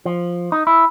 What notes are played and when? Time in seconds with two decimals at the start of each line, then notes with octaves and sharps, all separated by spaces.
0.06 F3
0.52 D#4
0.67 E4